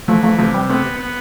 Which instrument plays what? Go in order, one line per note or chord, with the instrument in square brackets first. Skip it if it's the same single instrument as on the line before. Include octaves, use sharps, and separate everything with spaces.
[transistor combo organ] E3 [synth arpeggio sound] F3 A3
[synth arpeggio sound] F3 A3
[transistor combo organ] C3 [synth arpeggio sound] F3 A3
[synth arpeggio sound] G3 B3
[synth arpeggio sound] A3 C4 [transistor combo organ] B3
[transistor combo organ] B3